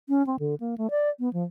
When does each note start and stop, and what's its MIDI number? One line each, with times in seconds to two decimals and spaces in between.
0.09 0.25 61
0.27 0.36 60
0.39 0.55 50
0.60 0.75 58
0.78 0.90 57
0.90 1.09 74
1.19 1.31 59
1.33 1.44 53